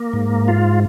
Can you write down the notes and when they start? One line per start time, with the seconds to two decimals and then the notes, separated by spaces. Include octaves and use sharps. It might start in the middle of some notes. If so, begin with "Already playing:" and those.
Already playing: A#3
0.13 G#2
0.48 F4